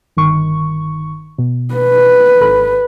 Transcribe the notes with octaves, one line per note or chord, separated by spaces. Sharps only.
G1 D#3 C#6
B2
B4
G#1 A4 B5